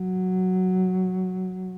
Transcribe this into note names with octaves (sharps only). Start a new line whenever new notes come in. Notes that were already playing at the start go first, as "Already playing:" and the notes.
Already playing: F#3